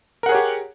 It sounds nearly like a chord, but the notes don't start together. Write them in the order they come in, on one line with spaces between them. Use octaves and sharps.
A#4 F#5 G#4 C#5 G4